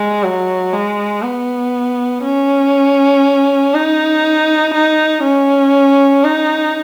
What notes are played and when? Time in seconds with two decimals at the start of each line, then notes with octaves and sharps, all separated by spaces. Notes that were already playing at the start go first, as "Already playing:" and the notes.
Already playing: G#3
0.23 F#3
0.73 G#3
1.23 B3
2.23 C#4
3.74 D#4
4.74 D#4
5.23 C#4
6.24 D#4